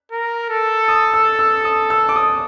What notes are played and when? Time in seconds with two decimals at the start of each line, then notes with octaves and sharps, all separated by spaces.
0.12 A#4
0.50 A4
0.88 D#6
1.14 E6
1.39 E6
1.65 D#6
1.90 E6
2.09 D6
2.16 D#6